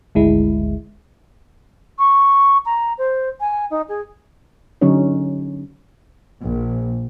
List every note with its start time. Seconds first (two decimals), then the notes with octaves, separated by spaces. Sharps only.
0.15 G#1 D2 G#3 E4
1.99 C#6
2.66 A#5
2.98 C5
3.40 G#5
3.70 D#4
3.89 G#4
4.81 D3 F#3 C#4 D#4 C#5
6.43 A#1